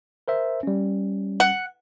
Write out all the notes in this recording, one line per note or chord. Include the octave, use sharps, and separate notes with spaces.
A#4 C5 E5
G3 C#4
F#5